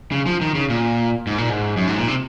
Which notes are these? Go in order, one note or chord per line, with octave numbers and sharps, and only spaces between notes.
C#3
F3
D#3
C#3
A#2
G#2
A#2
G#2
F#2
G#2
A#2
C3